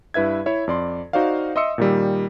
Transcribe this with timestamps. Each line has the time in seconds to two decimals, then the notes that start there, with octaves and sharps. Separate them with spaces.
0.14 G2 E4 B4 E5 G#6
0.46 E4 C#5 E5
0.67 F2 D5 C6
1.13 D#4 F#4 C5 D5 F5
1.56 D#5 E5 C6 D#6 E6 C#7
1.78 A#2 D#3 G3